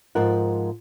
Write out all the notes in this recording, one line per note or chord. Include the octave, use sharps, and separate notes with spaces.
G#2 F3 A#4 F#5